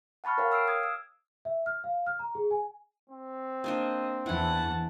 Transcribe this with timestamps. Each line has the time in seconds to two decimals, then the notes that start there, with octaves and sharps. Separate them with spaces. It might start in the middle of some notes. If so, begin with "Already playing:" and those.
0.24 F#5 A5 B5 C#6 F6
0.38 A#4 C#5 F5 G5
0.51 F5 E6 F6 C7 D7
0.68 D#6 F6 G#6
0.83 E6
1.45 E5
1.66 F6
1.84 F5
2.06 F6
2.19 A#5
2.35 G#4
2.51 G#5
3.10 C4
3.64 A#3 D4 C5 D#5
4.26 E2 E3 E4 F#5 A5